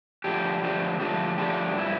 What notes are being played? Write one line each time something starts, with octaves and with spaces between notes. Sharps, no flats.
D3 F3 A3 D4 G4
D3 F3 A3 D4 G4
D3 F3 A3 D4 G4
D3 F3 A3 D4 G4
G2 F3 C4 E4 G4